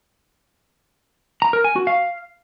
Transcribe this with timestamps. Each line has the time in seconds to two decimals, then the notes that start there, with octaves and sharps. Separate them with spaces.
1.42 A#5
1.53 A#4
1.64 G#5
1.76 F#4
1.87 F5